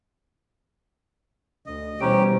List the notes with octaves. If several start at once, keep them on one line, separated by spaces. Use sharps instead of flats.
D2 D#5
B2 E3 G3 C#4 G4 C5 A#5 D7